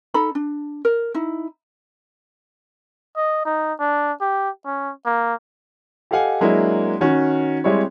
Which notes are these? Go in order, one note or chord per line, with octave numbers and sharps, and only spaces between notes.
D#4 A4 A#5 B5
D4
A#4
D#4 E4
D#5
D#4
D4
G4
C#4
A#3
G4 A4 D#5 F5 F#5 G#5
F#3 G#3 A#3 D4 E4
D#3 C#4 F#4
G3 G#3 C4 E4 C#5